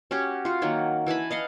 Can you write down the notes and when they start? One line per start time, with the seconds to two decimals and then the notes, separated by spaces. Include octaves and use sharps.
0.11 C#4 F#4 G4
0.45 F4 F#4
0.62 D#3 F#3 A#3
1.06 E3 G#5 A5 B5
1.31 D#5 F5 F#5